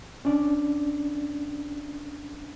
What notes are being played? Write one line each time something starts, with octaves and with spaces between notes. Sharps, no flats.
C#4 D4 D5